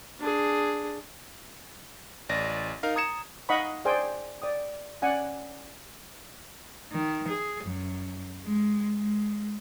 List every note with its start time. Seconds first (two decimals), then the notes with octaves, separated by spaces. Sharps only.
0.20 D4 G#4
2.29 A1 D5 A6 A#6
2.83 D#4 A#4 F5
2.95 A#5 D#6 G#6 C#7 E7
3.49 D#4 D#5 F5 F#5 B5 C#6
3.85 G#4 C5 D5 G5 G#5
4.42 D5 G5 D#6
5.02 C#4 D5 F#5 G#5
6.92 D#3
7.28 G#4
7.64 F#2
8.45 G#3
8.95 G#3